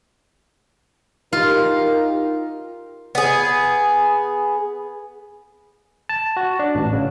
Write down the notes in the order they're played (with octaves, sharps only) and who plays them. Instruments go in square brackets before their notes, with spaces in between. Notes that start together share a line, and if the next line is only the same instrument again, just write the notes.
[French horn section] D#4 G4 A#4 [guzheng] F4
[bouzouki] B3 G#4
[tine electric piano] A5
F#4
D4
A1
C#3